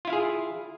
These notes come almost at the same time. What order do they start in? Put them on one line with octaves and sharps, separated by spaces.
F4 E4 F5 G#4